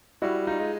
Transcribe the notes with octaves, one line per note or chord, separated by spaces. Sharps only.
G3 E4 F#4
D#4 F4
G#3